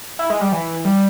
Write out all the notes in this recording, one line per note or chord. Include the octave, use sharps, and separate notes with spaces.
E4
G#3
G3
E3
G3